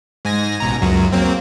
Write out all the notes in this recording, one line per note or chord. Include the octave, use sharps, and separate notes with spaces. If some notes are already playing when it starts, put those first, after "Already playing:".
G#2 G#5 A#6
A1 B2 A#5
C#2 F#2 F#3
F#3 A#3 C4